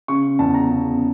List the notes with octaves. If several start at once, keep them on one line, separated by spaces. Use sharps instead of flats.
C#3 C#6
E2 A5
A#5
C#3